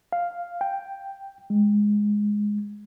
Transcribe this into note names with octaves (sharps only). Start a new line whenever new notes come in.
F5
G5
G#3